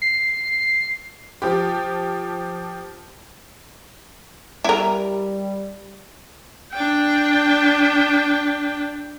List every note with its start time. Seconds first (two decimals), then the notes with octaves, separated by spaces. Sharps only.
0.02 C7
1.42 F3 G4
4.64 G3 E4 A#4
6.73 D4 G5